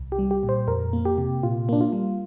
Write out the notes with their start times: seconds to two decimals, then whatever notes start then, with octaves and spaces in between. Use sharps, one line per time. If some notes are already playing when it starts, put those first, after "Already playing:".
Already playing: C2
0.12 G4
0.19 G3
0.31 G4
0.43 A#2
0.49 C5
0.68 F2 A#4
0.93 A#3
1.05 G4
1.18 C3
1.43 A#2 F4
1.69 A#3 D4
1.81 F4
1.93 G3